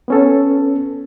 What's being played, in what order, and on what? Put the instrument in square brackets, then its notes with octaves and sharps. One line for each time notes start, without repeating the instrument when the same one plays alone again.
[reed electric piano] B3 C#4 A4